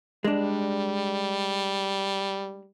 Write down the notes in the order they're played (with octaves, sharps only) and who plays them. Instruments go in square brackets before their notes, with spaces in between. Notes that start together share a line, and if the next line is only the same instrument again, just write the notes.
[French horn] G3 [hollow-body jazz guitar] G#3 D4